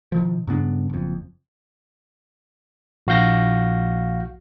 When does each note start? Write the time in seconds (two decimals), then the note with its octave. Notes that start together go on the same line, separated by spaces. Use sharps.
0.12 B2 D#3 F3
0.47 G2 C#3 B3 D4
0.90 F#1 F2
3.07 A#1 F#4 F5 G6 A#6